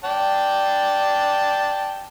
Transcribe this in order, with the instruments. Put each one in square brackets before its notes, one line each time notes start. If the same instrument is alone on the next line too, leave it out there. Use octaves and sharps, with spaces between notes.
[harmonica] D5 G5 A5